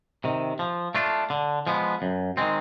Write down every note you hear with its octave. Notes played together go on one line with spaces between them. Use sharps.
C3 D#3
F3
A3 D4 F4
D3
F3 G#3 B3
F#2
D#3 G#3 C4